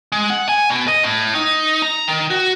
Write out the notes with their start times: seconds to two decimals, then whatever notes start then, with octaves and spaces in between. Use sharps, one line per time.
0.12 G#3
0.30 F#5
0.49 G#5
0.69 B2
0.88 D#5
1.03 A2
1.34 D#4
1.82 A#5
2.08 D#3
2.30 F#4